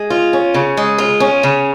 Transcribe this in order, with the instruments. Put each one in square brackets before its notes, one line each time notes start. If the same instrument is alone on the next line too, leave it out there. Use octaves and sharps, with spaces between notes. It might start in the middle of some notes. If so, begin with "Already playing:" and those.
Already playing: [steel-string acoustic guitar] G#3
F4
C#4
C#3
G#3
F4
C#4
C#3